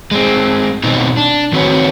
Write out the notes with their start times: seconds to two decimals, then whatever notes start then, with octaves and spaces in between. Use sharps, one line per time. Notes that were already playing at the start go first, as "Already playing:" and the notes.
0.11 G#3 C4
0.84 B2 D#3 C4 D#4
1.17 D4
1.53 D#3 C4 F#4 B4 C#5